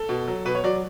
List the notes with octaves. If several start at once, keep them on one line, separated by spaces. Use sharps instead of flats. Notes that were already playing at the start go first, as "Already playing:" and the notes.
Already playing: A4
B2
F#3
B2 B4
C#5
F#3 D5